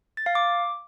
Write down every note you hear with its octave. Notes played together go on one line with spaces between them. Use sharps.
A6
F5
D6